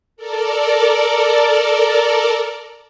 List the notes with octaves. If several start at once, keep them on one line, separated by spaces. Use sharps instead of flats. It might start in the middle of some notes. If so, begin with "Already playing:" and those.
A4 A#4 D5